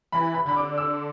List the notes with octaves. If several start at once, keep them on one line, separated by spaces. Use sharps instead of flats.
E3 B5
B5
D3 B5
D6
E6